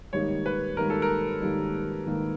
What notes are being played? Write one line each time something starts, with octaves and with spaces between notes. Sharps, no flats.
G#2 D#3 G3 A#3 D#4 C#5
B4
G#2 D#3 G3 A#3 D#4 A#4
A4
A#4
G#2 D#3 G3 A#3 D#4
G#2 D#3 G3 A#3 D#4